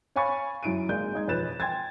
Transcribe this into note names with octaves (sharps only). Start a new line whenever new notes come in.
C#5 F5 G#5 B5 C#6 A6
F#2 E4 D7 D#7
G#1 G#3 A#3 D5 G6
G#3 D#4 G#6
E1 F2 B4 C#5 A6 E7
G5 C6 G#6 A6